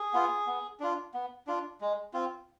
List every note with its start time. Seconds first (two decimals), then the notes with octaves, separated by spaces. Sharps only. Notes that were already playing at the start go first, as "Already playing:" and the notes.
Already playing: G#4
0.14 B3 F4
0.47 B3
0.80 D4 F4
1.14 B3
1.47 D4 F4
1.81 G#3
2.14 C4 F4